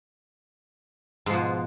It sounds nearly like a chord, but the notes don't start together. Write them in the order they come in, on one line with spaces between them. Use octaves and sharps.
G#2 F3 B2